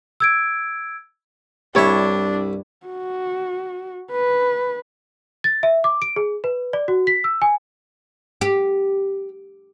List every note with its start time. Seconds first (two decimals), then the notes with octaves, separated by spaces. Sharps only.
0.20 E6 G#6 D7
1.75 C2 G2 D4 E4 C#5 E5
2.87 F#4
4.12 B4
5.44 A6
5.63 E5
5.84 D6
6.02 D7
6.16 G#4
6.44 B4
6.73 D5
6.88 F#4
7.07 B6
7.24 E6
7.42 G#5
8.41 G4